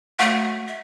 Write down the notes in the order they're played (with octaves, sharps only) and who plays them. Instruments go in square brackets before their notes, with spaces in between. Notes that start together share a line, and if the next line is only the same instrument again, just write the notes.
[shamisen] F#3 F5 F#5 [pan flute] A3
[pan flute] E5